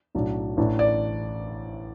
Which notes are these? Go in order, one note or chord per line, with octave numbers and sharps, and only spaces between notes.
B1 A2 F#3 D4
A1 A2 E3 D4
D5